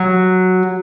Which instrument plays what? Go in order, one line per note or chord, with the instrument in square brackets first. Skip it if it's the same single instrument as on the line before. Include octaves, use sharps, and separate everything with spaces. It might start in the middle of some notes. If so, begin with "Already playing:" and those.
Already playing: [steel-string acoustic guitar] F#3